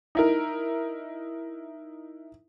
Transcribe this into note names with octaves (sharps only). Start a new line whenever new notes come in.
D#4 E4 A#4